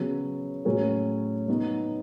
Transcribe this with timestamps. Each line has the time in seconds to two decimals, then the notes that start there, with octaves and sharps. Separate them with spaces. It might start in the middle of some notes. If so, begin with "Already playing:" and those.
Already playing: C#3 F#3 B3
0.65 A2 F#3 C#4 G#4
1.48 F#3 B3 D#4 F#4